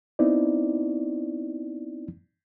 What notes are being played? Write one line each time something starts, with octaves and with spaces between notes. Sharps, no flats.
B3 C4 D#4 E4 D5